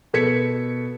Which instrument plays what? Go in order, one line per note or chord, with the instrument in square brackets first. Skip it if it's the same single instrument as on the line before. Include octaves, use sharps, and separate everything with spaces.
[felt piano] B2 A4 G#6 B6 C#7